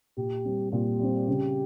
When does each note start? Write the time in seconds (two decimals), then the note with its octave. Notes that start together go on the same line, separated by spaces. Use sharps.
0.17 A#2 G4
0.45 G3 C4
0.72 A#2 G4
1.00 G3 C4
1.28 C#3